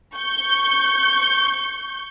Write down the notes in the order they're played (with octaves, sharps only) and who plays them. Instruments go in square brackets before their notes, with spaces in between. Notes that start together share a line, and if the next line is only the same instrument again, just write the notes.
[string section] C#6 G6